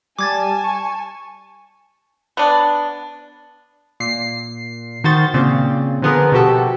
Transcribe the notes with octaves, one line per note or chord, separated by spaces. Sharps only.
G3 G#5 A5 D6 G#6 A6
C#6
B3 D4
A#2 C7
D#3 F#4 C5 A6
A#2 C#3 C4
D3 F3 B3 G#4 A#4 B4
B2 F3 F#4 G4 A4